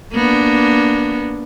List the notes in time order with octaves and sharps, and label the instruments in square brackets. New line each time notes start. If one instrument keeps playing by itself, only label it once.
[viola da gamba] A#3 B3 D4